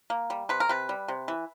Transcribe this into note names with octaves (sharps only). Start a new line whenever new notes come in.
A#3
G3
C3 B4
A#4
C3 B4
G3
C3
E3